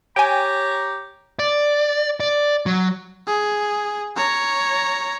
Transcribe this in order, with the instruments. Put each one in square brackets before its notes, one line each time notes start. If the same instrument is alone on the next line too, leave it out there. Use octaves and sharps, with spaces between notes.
[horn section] G4 C#5 A#5 [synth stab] G5 G#5
[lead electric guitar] D5
D5
F#3
[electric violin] G#4
C#5 A#5